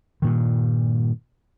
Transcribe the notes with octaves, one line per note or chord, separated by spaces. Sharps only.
G2 A#2 D#3